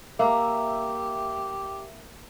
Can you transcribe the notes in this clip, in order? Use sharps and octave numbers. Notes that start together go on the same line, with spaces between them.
A#3 G4 E5